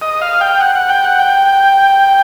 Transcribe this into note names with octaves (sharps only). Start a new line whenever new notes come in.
D#5
F5
G5
F#5
F#5
G5
F#5
G5